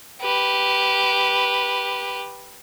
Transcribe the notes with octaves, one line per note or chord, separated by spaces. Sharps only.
G4 B4